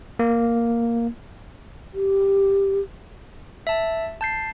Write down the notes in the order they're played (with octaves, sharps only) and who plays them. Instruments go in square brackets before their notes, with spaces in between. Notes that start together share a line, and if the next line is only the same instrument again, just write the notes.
[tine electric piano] A#3
[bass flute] G4
[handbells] E5 A5
A5 G6 C7